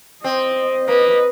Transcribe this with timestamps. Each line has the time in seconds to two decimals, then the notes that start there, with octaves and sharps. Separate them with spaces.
0.24 C4 D#5
0.88 A#3 B4 D#5